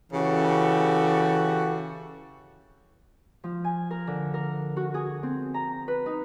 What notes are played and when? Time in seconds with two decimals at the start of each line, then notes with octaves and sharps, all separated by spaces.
0.12 C#3 E3 F#4 G4 A4
3.44 F3
3.64 G#5
3.91 A#4
4.07 D3
4.34 A#4
4.77 F#4
4.94 G#4
5.23 C4
5.54 A#5
5.88 B4
6.06 D#4